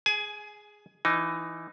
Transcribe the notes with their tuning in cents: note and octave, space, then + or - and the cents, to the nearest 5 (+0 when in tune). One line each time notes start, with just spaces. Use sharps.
G#4 +0 G#5 +25
E3 +15 D#4 +0